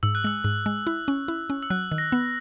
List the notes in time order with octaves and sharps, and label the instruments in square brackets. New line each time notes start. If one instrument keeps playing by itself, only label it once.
[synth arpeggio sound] G#2 [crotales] E6
[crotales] F#6
[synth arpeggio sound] G#3 [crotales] E6
[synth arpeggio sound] G#2
G#3
E4
C#4
E4
C#4
[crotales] E6
[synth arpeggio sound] F#3 [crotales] F#6
[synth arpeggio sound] D#3
[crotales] A#6
[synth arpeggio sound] B3